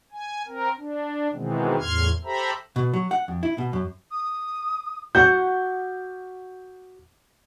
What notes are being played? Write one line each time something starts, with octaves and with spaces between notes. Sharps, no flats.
G#5
C4 A#4
D4
B2 D#3 E3 G#3 B3 C4
E2 A2 C6 F6 G#6
G4 A4 C5 E5 A#5 B5
B2
F#3
F#5
F2
E4
B2
F#2
D#6
F#4 F#5 G6